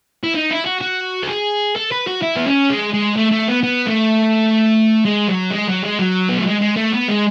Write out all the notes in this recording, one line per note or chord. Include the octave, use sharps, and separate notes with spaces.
E4
D#4
E4
F#4
F#4
A4
G#4
A4
B4
F#4
E4
B3
C#4
G#3
G#3
A3
A3
B3
B3
A3
G#3
F#3
G#3
F#3
G#3
F#3
B3
A3
G#3
G#3
A3
B3
G#3